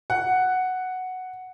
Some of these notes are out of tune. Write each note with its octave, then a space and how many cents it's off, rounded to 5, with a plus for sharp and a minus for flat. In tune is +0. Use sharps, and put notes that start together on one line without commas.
F#5 +0